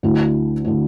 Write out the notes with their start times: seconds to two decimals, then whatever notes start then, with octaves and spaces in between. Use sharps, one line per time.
0.03 D2 D3 A3 E4
0.65 D3 A3 E4